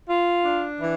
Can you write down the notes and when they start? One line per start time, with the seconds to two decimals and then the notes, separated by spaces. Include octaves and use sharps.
0.09 F4
0.45 D4
0.81 E3